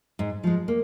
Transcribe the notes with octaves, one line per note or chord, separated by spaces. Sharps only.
G#2
F3 G#3
A#3